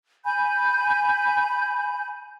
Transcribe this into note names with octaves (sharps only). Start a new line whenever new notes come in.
G#5 B5 G6